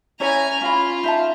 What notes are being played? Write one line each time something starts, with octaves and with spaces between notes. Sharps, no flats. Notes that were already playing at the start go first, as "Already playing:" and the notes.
C#4 E4 C#5 G#5 A#5
C#4 F4 B5
D#4 E5 A5